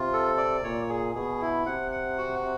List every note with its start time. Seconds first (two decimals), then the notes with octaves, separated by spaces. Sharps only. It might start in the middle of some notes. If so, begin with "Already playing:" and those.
Already playing: C3 F4
0.13 A4
0.37 D5
0.63 A#2 C#5
0.89 G#4
1.15 B2 G#4
1.41 E4
1.66 C3 F#5
1.92 F#5
2.18 F#4